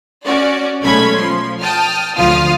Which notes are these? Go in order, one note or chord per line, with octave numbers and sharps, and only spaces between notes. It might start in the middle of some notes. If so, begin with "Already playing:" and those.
C#4 F#4 D5
B1 G#3 A3 C#4 B5 G#6
F3 C6
G5 A5 D#6 F6
D2 F3 F4 F5 D#6 F6